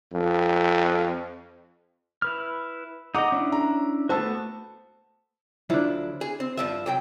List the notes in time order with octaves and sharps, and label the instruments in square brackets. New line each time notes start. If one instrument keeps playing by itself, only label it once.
[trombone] F2
[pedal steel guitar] E4 B4 F6
[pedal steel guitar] D#4 D#5 [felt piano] F#5 D6
[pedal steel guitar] C#4 D4 E4
[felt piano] A#5
[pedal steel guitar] A3 B3 F#4 [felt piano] C5 A5 E6
[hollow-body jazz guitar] D2 F3 F#3 [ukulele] D4 E4
[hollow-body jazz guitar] G#4
C4
G2 F3 E5
C2 F#3 G5